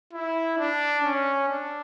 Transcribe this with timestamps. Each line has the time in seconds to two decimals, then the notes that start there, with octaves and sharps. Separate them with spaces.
0.13 E4
0.58 D4
1.04 C#4
1.48 D4